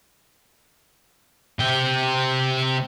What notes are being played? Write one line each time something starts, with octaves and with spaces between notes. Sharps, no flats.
C3 G5